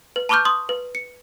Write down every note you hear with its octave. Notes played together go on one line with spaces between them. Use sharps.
B4
A5 B5 C#6 D6 F6 G6
C6 D#6
B4
C#7